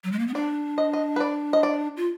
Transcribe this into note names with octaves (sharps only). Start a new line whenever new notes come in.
F#3
G#3
A#3
B3
D4 D5
D#5
D#5
B4
D5
D#5
D5
F4